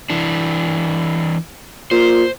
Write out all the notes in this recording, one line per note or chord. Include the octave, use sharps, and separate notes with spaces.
E3 D4
A#2 C5